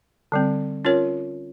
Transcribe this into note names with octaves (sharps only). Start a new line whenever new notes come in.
D3 G3 C4
C#4 F4 A#4 C#5